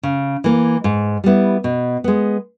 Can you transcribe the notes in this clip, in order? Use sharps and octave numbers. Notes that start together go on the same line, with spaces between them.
C#3
E3 A#3
G#2
G3 B3 E4
B2
G#3 B3